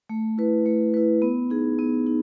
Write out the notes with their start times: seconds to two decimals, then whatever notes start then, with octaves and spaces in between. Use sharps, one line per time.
0.09 A3
0.38 E4 B4
0.66 A3
0.94 E4 B4
1.22 B3
1.50 D#4 G#4
1.79 B3
2.07 D#4